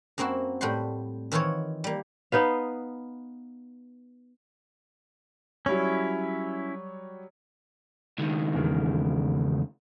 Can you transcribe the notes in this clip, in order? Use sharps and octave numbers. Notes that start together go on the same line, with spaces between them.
F#2 A#3 C4 E4 F#4
A2 G3 F#5 G5 C6
D#3 E3 E4 F4 C#5
G3 A#3
B3 D#4 B4 F5
F#3 G3 C#4 E4 C#5
C#2 D#3
E2 C#3 A#4